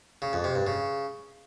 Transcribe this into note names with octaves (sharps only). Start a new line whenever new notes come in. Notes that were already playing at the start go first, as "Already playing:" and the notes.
C#3
F2
C3
G2
C#3